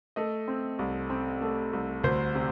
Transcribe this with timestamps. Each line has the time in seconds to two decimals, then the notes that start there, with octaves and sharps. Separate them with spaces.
0.16 A3 D#5
0.48 C4
0.79 C2
1.10 C4
1.41 A3
1.73 C2
2.03 D2 C5
2.35 C3